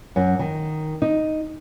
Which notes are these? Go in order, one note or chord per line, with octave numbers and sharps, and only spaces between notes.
F#2
D#3
D#4